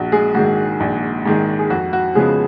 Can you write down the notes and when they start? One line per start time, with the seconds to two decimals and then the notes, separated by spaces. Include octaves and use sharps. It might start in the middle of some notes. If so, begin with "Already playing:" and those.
Already playing: A#1 F#4
0.12 G#3 G#4
0.35 G#2 D#3 G#3 F#4
0.80 A#1
1.26 G#2 D#3 G#3
1.59 G#4
1.70 F2 F#4
1.93 F#4
2.15 C#3 F3 G#3 B3 G#4